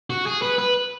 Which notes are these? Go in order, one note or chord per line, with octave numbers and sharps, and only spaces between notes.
F#4
G#4
B4
B4